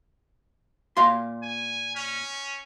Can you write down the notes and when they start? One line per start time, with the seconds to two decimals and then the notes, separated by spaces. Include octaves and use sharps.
0.97 A#2 F5 C6
1.43 G#5
1.96 C#4